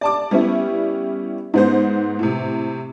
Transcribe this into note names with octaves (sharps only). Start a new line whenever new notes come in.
D5 A5 D6
G3 B3 C#4 E4
G#2 B3 C5
A2 C3